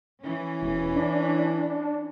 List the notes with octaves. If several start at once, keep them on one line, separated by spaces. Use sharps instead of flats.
E3 C#4
E1
D4